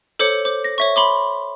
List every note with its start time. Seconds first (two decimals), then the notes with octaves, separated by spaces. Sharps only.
0.19 A4 C5 C#5 D6 C#7
0.45 C5 D6
0.64 A#6
0.78 C#5 E5 C#6
0.96 B5 C6 D6